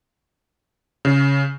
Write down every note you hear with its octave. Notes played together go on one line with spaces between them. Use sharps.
C#3